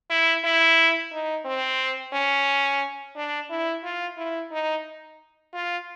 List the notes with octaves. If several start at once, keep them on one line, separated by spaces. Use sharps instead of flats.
E4
E4
D#4
C4
C#4
D4
E4
F4
E4
D#4
F4